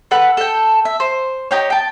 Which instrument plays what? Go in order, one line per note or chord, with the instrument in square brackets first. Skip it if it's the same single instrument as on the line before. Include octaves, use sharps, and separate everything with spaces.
[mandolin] A4 B4 F#5 B5
A4 G5
E5
C5
D#4 G4 C#5
G5 A5